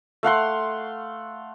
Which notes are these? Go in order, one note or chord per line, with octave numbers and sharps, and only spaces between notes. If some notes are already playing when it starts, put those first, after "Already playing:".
A3 F5 F#5 C6